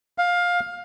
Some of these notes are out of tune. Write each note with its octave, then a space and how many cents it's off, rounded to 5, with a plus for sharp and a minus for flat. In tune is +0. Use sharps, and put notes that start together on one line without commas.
F5 +15